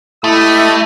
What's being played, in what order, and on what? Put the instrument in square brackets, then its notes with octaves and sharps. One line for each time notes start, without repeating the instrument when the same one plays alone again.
[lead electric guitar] A3 [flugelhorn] E4 [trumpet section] G4 D#5 D#6